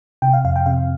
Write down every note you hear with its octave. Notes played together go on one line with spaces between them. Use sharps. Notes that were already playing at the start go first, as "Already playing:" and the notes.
C3 G5
F5
F2 F5
G5
C3 F5